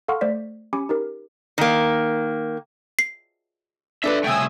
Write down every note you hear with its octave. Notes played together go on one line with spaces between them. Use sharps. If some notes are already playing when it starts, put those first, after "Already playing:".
A4 F5 F#5 C6 C#6 F6
A3 C5 D5 B6
C#4 G4 G#5 B5 D6 C#7
D#4 G4 A#4
D#3 A#3
C7
D4 A4 B4 D5 E5
C2 C#3 A3 G5 G#5 D#6 E6